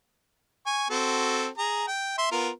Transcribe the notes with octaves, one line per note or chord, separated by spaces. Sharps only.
G#5 C#6
C4 F#4 A4
G#4 A#5
G5
E5 C6
B3 F4 A#4